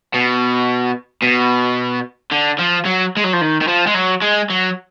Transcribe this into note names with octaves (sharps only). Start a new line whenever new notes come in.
B2
B2
D3
F3
F#3
G#3
F#3
F3
D#3
D#3
F3
G#3
F#3
G#3
F#3